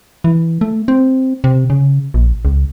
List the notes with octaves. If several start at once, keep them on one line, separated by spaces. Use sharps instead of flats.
E3
A3
C4
C3
C#3
A#1
C#2